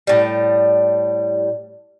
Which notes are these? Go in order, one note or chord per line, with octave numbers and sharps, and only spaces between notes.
A2 G3